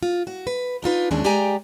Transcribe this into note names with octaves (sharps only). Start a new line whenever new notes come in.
F4
F#4
B4
D4 D#4 F4 B4
D#2 E3 G#3 C#4 D4
G#3 G4 D5 G5 G#5 A#5